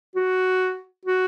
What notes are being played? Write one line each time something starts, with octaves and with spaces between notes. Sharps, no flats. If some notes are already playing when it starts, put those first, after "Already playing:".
F#4
F#4